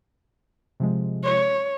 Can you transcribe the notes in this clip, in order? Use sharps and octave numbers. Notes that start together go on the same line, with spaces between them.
C3 F3 G#3
C#5